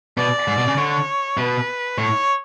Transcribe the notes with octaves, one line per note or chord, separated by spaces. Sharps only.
B2 D5
G#2
B2
C#3
D3 C#5
B2 B4
A2 C#5